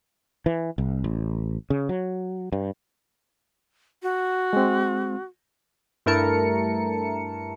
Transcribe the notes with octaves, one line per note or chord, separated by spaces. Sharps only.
E3
C2
A1
C#3
F#3
G2
F#4
G#3 C4
G2 A3 E4 A#4 A5 C#7